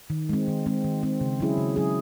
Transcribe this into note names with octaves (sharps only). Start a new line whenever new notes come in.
D#3
G#3 C4
D#3
G#3 C4
D#3
G#3 C4
C#3
F#3 C#4 E4 G#4
C#3
F#3 C#4 E4 G#4